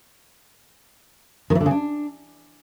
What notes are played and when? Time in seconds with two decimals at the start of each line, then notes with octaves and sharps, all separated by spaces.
1.50 D#3
1.55 E3
1.61 D3
1.66 C#3
1.71 D4